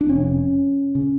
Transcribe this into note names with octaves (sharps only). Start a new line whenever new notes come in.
D4
F1 F2 C3 C#4
C#3